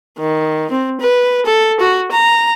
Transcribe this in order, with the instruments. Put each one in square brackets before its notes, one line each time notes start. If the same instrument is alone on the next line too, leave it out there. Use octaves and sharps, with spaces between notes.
[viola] D#3
C4
B4
A4
F#4
A#5